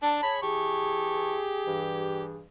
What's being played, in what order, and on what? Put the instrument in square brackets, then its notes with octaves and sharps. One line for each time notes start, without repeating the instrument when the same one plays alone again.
[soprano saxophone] D4 [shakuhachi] A5
[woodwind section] G#4 C#5 [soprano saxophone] B5
[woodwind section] E3 A5 C#6 [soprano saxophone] G4 [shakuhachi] G#4
[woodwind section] G2 E3